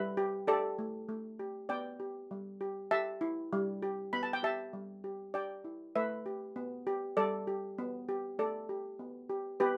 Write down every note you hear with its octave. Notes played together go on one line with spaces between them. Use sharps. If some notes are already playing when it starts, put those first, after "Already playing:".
Already playing: G3 B4 E5
G4
G4 A4 D5
A3
A3
G4
B3 D5 G5
G4
G3
G4
G4 E5 A5
E4
G3
G4
B3 B5
A5
G5
G4 E5 A5
G3
G4
G4 D5 G5
E4
A3 B4 E5
G4
B3
G4
G3 A4 D5
G4
B3
G4
A3 A4 D5
G4
B3
G4
B3 G4 B4